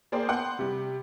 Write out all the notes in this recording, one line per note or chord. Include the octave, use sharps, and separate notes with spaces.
A#3 G#4 A#4 C5 D5 G5
B3 F#5 C6 G6
C3 G3